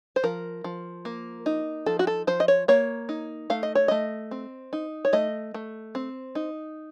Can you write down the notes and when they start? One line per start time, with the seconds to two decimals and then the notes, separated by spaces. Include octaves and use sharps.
0.16 C5
0.24 F3 A#4
0.64 F3
1.05 A#3
1.46 D#4
1.86 F3 A4
1.99 F#4
2.07 A4
2.27 F3 C5
2.40 D#5
2.48 C#5
2.68 A#3 C#5
3.09 D#4
3.50 A3 F5
3.63 D#5
3.75 C#5
3.88 A3 D#5
4.31 C4
4.73 D#4
5.05 C#5
5.13 A3 D#5
5.54 A3
5.95 C4
6.35 D#4